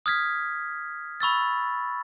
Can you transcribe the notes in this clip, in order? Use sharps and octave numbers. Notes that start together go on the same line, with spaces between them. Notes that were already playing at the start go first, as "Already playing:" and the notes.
D#6 F6 G#6 B6
B5 C#6 E6 A6